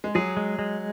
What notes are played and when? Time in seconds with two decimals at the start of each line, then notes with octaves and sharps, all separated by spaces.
0.04 G#3
0.15 F#3 G#4
0.37 G#3
0.59 G#3